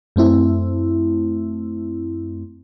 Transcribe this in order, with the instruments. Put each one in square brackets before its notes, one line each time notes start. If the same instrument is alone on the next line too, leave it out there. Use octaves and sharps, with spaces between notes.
[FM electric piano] F#2 A3 C4 E4